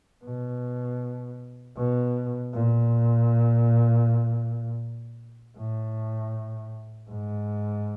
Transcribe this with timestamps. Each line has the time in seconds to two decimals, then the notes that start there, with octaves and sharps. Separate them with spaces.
0.24 B2
1.77 B2
2.53 A#2
5.57 A2
7.09 G#2